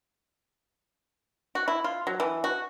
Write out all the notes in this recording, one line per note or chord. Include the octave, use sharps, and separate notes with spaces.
F#4
E4
F4
F#3
E3
F#4